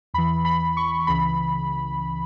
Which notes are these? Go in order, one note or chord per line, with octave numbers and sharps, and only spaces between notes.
E2 E3 B5
B5
C#6
C#2 C#3 E3 B5